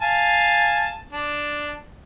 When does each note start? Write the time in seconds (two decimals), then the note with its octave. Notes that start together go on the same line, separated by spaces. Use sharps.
0.02 F5 G#5 A5
1.13 D4